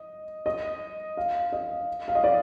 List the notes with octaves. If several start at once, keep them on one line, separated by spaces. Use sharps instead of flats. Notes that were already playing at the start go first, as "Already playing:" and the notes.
Already playing: D#5
D#5
F5
D#5
F5
D#5
D5